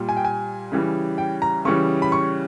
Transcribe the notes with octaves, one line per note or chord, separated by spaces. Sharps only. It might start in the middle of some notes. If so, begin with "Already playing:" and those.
Already playing: A#2 G3
G#5
G5
G#5
C#3 E3 G3
G5
A#5
C#3 E3 G3 C#6
B5
C#6